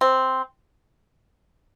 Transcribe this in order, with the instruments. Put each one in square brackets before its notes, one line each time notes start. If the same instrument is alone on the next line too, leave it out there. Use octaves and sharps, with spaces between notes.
[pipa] C4